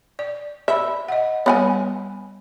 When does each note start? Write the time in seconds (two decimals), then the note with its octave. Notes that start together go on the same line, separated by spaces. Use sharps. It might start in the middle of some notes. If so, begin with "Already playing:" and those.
0.19 D5
0.68 D5 E5 B5
1.08 D#5 F#5
1.46 G3 B3 C#5 F#5 G#5